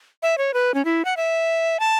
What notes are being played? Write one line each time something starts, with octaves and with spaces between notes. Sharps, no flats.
E5
C#5
B4
C#4
E4
F#5
E5
A5